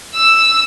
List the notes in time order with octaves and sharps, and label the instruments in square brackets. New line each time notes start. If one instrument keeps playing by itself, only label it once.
[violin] E6